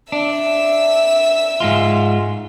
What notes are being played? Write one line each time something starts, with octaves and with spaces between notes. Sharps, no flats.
D4 E5 E6
G#2 G#3 F4